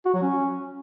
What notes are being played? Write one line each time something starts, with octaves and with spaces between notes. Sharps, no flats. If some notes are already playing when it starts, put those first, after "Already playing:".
F#4
F#3
C#4